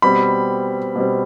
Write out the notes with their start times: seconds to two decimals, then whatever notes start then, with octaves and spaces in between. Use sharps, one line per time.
0.02 B2 G3 C4 B5
0.95 B2 G3 C4